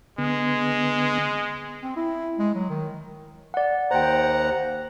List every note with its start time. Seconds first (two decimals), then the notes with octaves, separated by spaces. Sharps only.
0.18 D3 G#3 B3
1.83 C4
1.96 E4
2.39 G#3
2.55 F#3
2.70 D#3
3.54 D5 F#5
3.91 D#2 C5 F#5 G5 A#5